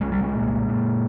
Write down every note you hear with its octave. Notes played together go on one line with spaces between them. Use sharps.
C2 G#3
G3
G#3
A#2
A#2